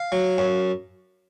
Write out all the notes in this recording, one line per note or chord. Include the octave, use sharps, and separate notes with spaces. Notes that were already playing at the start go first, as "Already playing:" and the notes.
Already playing: F5
F#3
F#2